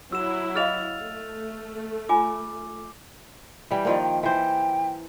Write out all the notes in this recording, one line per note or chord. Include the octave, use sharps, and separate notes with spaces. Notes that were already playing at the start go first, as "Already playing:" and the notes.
F#3 E4 F#4 E6 E7
G#4 D#5 F5 F6 A6 F7
A3
F4 G#5 B5 D6
E3 G3 G5
D#3 F3 A#3 D5
G5
E3 C5 G5